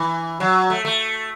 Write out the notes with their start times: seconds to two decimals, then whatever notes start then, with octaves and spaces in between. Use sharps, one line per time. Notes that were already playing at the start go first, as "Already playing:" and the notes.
Already playing: E3
0.40 F#3
0.70 A3
0.85 A3